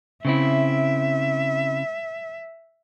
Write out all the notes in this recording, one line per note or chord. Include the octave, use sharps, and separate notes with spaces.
C#3 C4 E4 E5